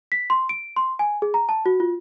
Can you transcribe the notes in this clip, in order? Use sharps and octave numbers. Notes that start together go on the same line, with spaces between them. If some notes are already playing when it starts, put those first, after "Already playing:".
B6
C6
D7
C6
G#5
G#4
A#5
A5
F#4
F4